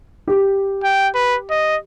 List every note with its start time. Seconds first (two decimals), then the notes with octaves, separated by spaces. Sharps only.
0.28 G4
0.83 G5
1.14 B4
1.50 D#5